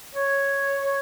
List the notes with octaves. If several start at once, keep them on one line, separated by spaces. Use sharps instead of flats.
C#5